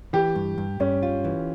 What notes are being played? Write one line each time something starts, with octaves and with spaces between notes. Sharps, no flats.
E3 G4
G2
G2
G2 C#4
F4
E3